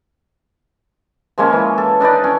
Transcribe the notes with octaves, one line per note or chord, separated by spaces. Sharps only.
F3 G#3 A#3 C#4
E3
A4
D4 D#4 B4 D5
C#4